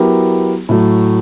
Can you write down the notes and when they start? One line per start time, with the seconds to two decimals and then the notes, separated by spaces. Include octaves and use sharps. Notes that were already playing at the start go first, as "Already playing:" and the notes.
Already playing: F#3 B3 E4 G4 A#4
0.69 A2 F#3 A3